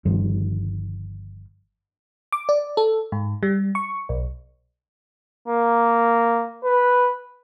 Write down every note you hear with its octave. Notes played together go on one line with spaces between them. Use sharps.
G1 G2 D#3 F3
D6
D5
A4
G#2
G3
C#6
B1
A#3
B4